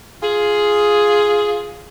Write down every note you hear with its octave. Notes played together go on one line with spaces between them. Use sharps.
F4 G#4